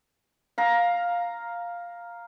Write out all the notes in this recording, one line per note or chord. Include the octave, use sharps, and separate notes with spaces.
F5 A#5